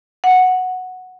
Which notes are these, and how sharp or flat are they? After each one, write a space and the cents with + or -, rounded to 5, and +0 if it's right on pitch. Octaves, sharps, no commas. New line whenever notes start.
F#5 -5